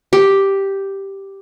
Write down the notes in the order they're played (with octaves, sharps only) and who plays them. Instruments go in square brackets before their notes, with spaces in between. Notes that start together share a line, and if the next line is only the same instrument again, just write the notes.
[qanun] G4